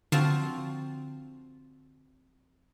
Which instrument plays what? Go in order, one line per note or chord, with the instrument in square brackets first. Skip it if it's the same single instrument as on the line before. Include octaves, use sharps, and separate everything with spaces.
[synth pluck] D3 [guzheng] F3 C4 F#4